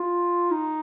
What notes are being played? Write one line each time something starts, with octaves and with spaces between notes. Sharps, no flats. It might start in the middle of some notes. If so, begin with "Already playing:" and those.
Already playing: F4
D#4